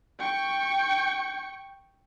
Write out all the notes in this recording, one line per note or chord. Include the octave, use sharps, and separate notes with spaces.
G5 C#6